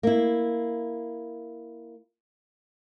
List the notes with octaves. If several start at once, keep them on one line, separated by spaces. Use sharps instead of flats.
A#3 E4